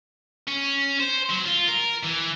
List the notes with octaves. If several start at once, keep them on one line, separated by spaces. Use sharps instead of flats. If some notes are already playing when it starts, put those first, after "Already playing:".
C#4
C5
F#3
F4
A#4
E3